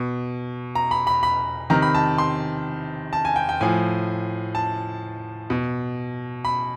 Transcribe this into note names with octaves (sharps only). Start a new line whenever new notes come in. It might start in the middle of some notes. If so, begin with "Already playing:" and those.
Already playing: B2
A#5
B5
B5
B5
C3 D#3 A#5
B5
A5
C6
A5
G#5
G5
G5
A2 F3 G#5
A5
B2
B5